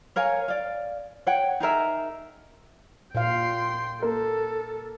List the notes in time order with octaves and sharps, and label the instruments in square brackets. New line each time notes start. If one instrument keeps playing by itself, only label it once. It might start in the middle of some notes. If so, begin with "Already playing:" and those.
[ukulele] A#4 C#5 F5 G#5
D5 F5
C#5 F#5 G5
D#4 G#4 A#4 E5
[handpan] A#2 F5 [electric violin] G5 C6
[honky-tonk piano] A#3 [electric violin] A4